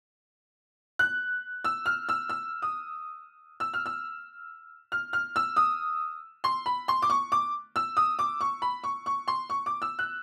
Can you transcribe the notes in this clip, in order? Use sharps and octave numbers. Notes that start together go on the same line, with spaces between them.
F#6
E6
F6
E6
E6
D#6
E6
F6
E6
F6
F6
E6
D#6
C6
B5
C6
D6
C#6
D6
E6
D#6
D6
C#6
B5
C#6
C#6
C6
C#6
D6
E6
F#6